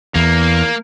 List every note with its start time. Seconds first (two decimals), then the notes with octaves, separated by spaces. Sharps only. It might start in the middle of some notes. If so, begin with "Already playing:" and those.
0.15 E2 A#3